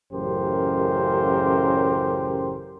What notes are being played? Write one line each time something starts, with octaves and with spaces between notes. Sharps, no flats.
A1 F#2 C#3 G4 A#4 C5